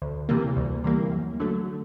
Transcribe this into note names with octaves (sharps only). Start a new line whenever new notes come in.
D2
C3 E3 G3 A#3
D2
C3 E3 G3 A#3
F#2
D3 F#3 A3